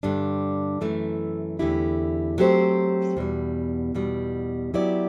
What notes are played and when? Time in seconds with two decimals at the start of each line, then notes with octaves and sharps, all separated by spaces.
0.03 G2 D3 G3 D4
0.81 F#2 E3 A3
1.59 E2 D3 A3 E4 G4
2.38 F#3 A3 C4 G4 C5
3.17 E2 B2 G3
3.95 E2 B2 G3
4.74 F#3 B3 E4 G4 D5